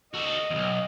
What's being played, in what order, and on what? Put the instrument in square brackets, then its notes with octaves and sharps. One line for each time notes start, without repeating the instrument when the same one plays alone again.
[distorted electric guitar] F#4 A4 [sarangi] D#5
[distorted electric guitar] B1 E2